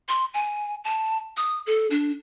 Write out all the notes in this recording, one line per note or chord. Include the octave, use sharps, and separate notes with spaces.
C6
G#5
A5
D#6
A4
D4